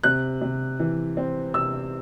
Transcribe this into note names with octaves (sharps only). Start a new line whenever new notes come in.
C3 F#6
C3
E3
C4
C3 E6